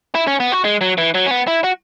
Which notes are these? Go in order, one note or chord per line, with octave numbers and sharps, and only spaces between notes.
E4
C#4
B3
F#4
G#3
F#3
E3
F#3
C#4
B3
E4
F#4